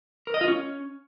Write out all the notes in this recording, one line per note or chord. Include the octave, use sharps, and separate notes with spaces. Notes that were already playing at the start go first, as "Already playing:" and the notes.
A#4
D#5
F4
C#4